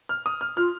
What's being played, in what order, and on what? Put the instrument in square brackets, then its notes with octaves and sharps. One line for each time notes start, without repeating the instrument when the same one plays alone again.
[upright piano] F6
D#6
F6
[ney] F4 [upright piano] F6